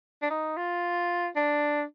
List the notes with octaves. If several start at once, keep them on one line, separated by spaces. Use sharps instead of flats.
D4
D#4
F4
D4